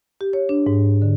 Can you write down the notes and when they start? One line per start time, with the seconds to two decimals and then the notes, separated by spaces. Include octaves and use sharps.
0.21 G4
0.33 C#5
0.49 D4
0.67 G#2
1.02 D3